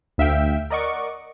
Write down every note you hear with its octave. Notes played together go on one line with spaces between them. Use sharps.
D2 E5 F5 G5 E6
A#4 D5 D#5 F#5 C#6 D6